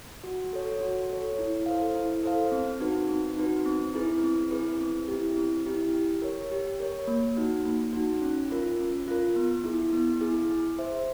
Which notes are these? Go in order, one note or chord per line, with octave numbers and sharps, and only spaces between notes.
F#4
A4 C#5
F#4
A4 C#5
E4
A4 C5 F5
E4
A4 C5 F5
C4
D#4 F#4 B4
C4
D#4 F#4 B4
C4
E4 G#4 B4
C4
E4 G#4 B4
C4
E4 G4
C4
E4 G4
G4
A#4 C#5
G4
A#4 C#5
A#3
D#4 F#4
A#3
D#4 F#4
C#4
F4 A#4
C#4
F4 A#4
B3
E4 G#4
B3
E4 G#4
G#4
C5 E5